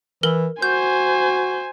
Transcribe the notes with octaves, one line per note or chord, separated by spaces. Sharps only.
E3 A#4 F#7 G7
F#4 C5 G#5 G6